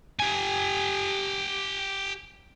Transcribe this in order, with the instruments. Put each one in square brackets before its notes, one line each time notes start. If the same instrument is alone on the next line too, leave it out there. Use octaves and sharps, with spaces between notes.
[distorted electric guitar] G4 G#5